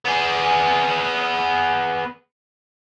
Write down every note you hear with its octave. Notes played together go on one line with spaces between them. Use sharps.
B3 G#4